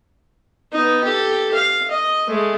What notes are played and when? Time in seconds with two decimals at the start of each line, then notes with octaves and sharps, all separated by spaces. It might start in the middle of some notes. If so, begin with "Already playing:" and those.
0.72 B3 D#4
1.04 G4 A4
1.54 F5
1.91 D#5
2.27 G#3 A3